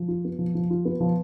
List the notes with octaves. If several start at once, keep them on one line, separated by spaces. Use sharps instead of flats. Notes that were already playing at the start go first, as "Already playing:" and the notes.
Already playing: F3
F4
B3
F3
F3
F4
B3
F3